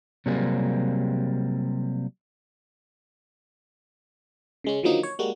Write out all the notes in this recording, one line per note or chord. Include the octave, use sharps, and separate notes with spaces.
C3 F#3 G3 A#3 C4 G#4
C#3 G#3 C#4
D3 D#3 F3 F#3 A#3 D#4
C#5
G3 G#3 A#3 F#4